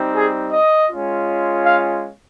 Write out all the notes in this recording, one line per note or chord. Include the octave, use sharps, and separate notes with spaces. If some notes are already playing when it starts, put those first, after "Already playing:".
Already playing: G3 C4 D#4
G#4
D#5
G#3 C#4 F4
F5